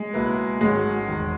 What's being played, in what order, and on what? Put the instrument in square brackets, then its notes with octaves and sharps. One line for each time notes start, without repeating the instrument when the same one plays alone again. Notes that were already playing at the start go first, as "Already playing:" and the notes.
Already playing: [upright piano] G#3
[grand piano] C#2 B2 A#3 E4 B4
[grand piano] G#1 G#2 D#3 F#3 C#4 [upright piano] G#3
[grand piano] E1 E2 D#3